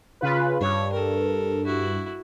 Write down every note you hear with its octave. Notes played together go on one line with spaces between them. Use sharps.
C#3 F4 B4
G2 C#5
A4 A#4
E4 F#4